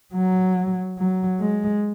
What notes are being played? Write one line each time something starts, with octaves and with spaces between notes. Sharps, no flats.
F#3
F#3
G#3